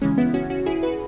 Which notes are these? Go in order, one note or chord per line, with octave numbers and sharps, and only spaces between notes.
C#3 E3 G#3 C#4
B3 E4
C#4 F#4
C#4 F#4
E4 G#4
F#4 B4